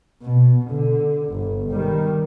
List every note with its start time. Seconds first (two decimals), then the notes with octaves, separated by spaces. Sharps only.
0.22 B2
0.70 D3
1.32 G1
1.71 D#3 G3